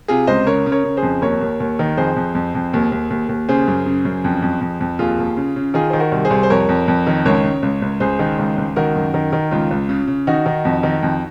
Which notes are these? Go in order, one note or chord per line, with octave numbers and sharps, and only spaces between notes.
C3 F4 G#4
C#2 C5 D#5
C#3 A#4 C#5
C#3
A#4 C#5
C#3
G#4 C5
F2
D#2 A#4 C#5
D#2
D#2
D#3
F2 G#4 C5
F2
F2
F2
D#2
D#2
D#2
D#2
C#3 G#4 C5
F#2
C#3
F#2
F2
F2
F2
F2
D#2 F4 G#4
D#2
C#3
C#3
D#3 F4 G#4
D#3 C5
F#4 A#4
C2
G#4 C5
C2
C5
F2 A#4 C#5
F2
F2
D#3
C#2 A#4 C#5
C#3
C#2
C#2
C#2 G#4 C5
D#3
C#2
C#2
D#3 F#4 A#4
F#2
D#3
D#3
C#2 F4
C#2
C#3
C#3
D#3 D#4 F#4
D#3
F2
D#3
F2